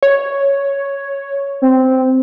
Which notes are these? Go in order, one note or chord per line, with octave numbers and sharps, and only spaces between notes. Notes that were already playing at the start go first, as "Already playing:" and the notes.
C#5
C4